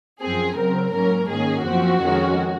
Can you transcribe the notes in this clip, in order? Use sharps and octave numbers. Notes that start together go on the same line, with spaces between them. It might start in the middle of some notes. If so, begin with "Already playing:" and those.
F#2 F3 C4 G#4
C#3 F#3 C4 A#4
G#2 F#3 A#3 C#4 A#4
G#2 D#3 A#3 C#4 G#4
F#2 F3 C4 F#4
F2 D#3 G#3 C#4